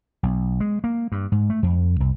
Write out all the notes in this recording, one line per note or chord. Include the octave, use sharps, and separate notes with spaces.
B1
G#3
A#3
G2
G#2
A3
F2
C2